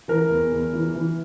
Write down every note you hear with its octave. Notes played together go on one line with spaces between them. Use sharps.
E3 A#4
E2
E2
E3
E3